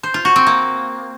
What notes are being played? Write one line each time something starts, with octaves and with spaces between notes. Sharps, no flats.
C5
F4
F#4
C4
A#3